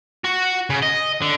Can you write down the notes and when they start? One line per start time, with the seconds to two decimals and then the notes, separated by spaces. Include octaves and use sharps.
0.24 F#4
0.70 C#3
0.83 D#5
1.22 D3